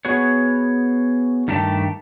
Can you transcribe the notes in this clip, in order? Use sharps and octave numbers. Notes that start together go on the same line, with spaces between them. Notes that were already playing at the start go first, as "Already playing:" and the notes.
B3 F#4 G#4 C#5
G2 D#3 A3 G4 A5